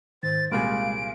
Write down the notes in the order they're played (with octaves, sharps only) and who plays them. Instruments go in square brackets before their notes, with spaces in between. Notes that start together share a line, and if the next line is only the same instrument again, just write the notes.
[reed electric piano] G#2 D#3 [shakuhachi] C5 [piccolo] A6
[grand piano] C2 A#2 G#4 [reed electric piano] G#3 [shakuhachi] F5 [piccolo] D7